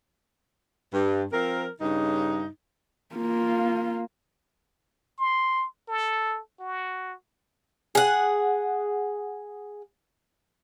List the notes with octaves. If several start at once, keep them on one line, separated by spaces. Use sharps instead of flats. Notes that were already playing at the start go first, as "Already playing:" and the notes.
G2
F3 C4 A#4
G2 C#3 D#4
A#3 F4
C6
A4
F#4
G#4 F#5